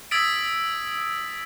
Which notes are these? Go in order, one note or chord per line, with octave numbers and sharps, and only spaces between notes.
D#6 E6 G#6 A6 B6 D7